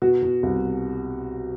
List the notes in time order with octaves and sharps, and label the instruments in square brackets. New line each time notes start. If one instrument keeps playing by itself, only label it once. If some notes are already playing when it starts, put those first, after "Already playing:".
[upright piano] B2 F#4
B2
C2